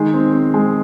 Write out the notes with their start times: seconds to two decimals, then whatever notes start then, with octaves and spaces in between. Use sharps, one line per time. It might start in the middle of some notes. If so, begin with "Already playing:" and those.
Already playing: D#3 G#3
0.14 C4
0.33 C4
0.54 G#3